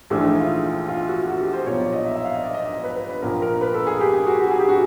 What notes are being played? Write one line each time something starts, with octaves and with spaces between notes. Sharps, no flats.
A#1 G#2 E3 A3 D4
D#4
E4
F4
F4
F#4
F#4
G4
C5
B1 A#2 F3 C#5
D5
D#5
E5
E5
F5
D#5
D5
D#5
D#5
B4
B4
B4
A#1 A#2 F3 A#4
A#4
B4
A4
G#4
G4
G#4
F#4
F#4
G#4
G4
F#4